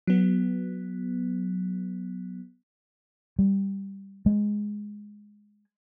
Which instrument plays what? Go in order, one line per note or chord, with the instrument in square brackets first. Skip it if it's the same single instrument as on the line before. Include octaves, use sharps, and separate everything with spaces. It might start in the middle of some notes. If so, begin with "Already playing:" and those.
[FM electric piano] F#3 B3
[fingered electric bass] G3
G#3